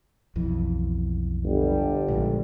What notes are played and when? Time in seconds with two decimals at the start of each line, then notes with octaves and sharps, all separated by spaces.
0.36 B1 F2 E3
1.45 G1 D3 G3
2.08 A#1 G#2 D#3